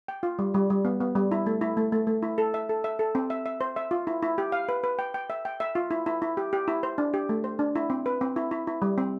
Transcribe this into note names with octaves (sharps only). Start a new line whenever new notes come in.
G5
F4
G3
G3
G3
B3
B3
G3
E4
A3
E4
A3
A3
A3
E4
A4
E5
A4
E5
A4
C4
E5
E5
C5
E5
F4
E4
E4
G4
F5
B4
B4
G5
G5
E5
G5
E5
F4
E4
E4
E4
G4
G4
E4
C5
D4
G4
A3
C5
D4
E4
C4
B4
C4
E4
E4
E4
G3
C4